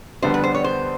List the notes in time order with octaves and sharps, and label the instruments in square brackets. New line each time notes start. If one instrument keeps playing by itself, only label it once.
[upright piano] F2 D3 G3 B3 D4 [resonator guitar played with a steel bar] C5
[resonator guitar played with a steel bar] B4
C5
C#5
C5